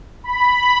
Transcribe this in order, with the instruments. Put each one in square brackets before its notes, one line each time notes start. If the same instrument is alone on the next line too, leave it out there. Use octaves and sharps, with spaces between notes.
[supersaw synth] B5